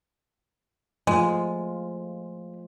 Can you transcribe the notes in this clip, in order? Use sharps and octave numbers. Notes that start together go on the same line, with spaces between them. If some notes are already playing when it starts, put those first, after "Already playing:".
F3 G#3 A3 F4